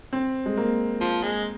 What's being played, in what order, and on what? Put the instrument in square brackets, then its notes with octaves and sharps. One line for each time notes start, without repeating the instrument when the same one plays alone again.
[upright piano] C4
G#3
A#3
[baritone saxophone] F3
G#3